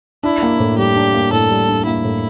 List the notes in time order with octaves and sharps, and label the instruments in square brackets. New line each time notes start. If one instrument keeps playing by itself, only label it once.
[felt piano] D4 [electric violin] E4
[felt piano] A#3
A2
[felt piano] G3 [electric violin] G4
[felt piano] D4
A#3
[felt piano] A2 [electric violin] A4
[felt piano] G3
D4
[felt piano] A#3 [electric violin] E4
[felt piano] A2